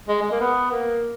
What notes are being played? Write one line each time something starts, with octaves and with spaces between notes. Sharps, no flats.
G#3
G#3
A#3
B3
A#3